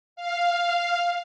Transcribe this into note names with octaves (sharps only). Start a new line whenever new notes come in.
F5